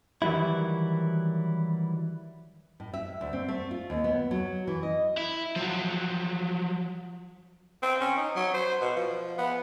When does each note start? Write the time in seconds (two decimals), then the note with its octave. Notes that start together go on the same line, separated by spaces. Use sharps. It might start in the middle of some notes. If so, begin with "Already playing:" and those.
0.22 D#3 E3 F#3 G3 E4
2.80 A2
2.94 E5
3.21 D2
3.33 C4
3.48 A3
3.71 F4
3.90 D#2
4.04 B3
4.31 F#3
4.67 E3
4.83 D#5
5.17 E4
5.56 F3 F#3
7.82 C4
8.01 C#4
8.17 D#4
8.36 F#3
8.54 C5
8.81 B2
8.96 F3
9.38 B3